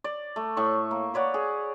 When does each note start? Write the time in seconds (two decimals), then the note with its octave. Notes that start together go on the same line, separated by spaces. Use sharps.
0.04 D5
0.36 A3
0.57 A2 C#6
0.91 A#3
1.14 B4 C#5 D5 F#5
1.34 G#4